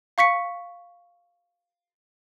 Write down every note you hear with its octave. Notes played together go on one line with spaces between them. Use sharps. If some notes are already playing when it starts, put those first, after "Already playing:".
F5 C#6 B6 C#7